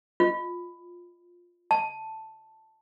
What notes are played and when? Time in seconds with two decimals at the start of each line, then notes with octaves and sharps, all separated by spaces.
0.20 F4
1.71 A5